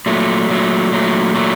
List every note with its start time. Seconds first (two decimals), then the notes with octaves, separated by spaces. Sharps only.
0.06 A#2 F#3 A3
0.49 A#2 F#3 A3
0.91 A#2 F#3 A3
1.34 A#2 F#3 A3